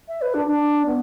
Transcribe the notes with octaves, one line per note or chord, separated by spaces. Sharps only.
E5
B4
D4
D4
B3